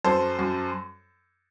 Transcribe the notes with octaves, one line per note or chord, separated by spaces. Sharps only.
F#2 A4 C5
F#2